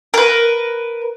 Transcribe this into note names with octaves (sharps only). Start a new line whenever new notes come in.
A#4 B4